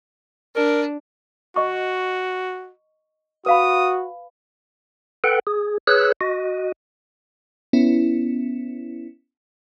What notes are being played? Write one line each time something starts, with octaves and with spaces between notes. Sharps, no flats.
D4 A#4
F#4 D#5 C#6
F#4 B4 F5 B5 D#6
A4 B4 F#5 G5
G#4
G#4 B4 C#5 E6 F#6
F#4 D#5
B3 C#4 E4